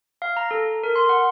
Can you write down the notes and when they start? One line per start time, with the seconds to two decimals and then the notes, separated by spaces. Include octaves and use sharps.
0.22 F5
0.37 A#5
0.51 A4
0.83 A#4
0.96 C6
1.09 F#5